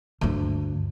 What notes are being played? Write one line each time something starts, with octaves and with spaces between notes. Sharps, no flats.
D2 G2